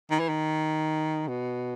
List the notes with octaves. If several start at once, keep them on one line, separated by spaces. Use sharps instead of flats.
D#3
E3
D#3
B2